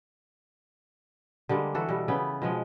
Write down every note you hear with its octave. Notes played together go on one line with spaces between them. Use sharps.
D3 G3 G#3 A#3
E3 F#4 A4
B2 G3
C#3 B3 G5
B2 F3 G#3